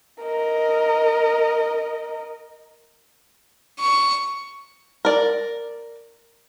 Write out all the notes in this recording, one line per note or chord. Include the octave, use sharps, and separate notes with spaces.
A#4 D#5
C#6
A#4 D5